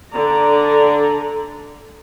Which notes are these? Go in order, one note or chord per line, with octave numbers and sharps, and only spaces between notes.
D3 D5 A#5